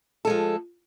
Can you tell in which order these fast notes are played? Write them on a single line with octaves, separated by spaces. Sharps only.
A4 G#3 F3